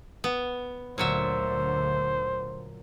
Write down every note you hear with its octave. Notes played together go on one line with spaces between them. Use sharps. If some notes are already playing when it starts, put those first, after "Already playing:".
B3
D2 A#2 D3 F#3 C5 E5